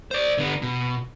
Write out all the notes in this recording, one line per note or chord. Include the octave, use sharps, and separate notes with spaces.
C5 D5
D3 B3
B2